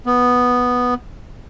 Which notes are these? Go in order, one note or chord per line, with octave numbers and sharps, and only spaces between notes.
B3